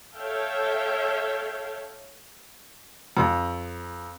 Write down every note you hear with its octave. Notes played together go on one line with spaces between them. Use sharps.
A4 C#5 E5 F5 G5 A5
F2